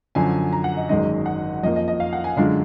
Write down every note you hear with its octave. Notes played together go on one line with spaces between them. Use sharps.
F#2 D3 F3 G#5
A#5
F#5
D#5
G#1 F#2 D#3 G#3 D#4 D#5
F#5
F2 F3 A#3 D#5
D#5
D#5
F5
F#5
G#5
F#2 D3 G#3 D4 F4